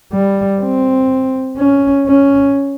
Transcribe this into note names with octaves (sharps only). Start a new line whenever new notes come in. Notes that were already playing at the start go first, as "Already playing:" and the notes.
G3
C4
C#4
C#4